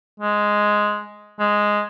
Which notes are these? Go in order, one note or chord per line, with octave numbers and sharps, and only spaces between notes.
G#3
G#3